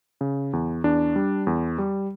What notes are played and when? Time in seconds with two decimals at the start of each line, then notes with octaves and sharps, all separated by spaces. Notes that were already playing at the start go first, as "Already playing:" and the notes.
0.21 C#3
0.53 E2
0.84 E2 D4
1.16 G3
1.47 E2
1.78 G3